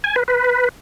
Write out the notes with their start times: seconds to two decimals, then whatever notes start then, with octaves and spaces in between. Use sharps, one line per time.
0.04 G#5
0.16 B4
0.28 B4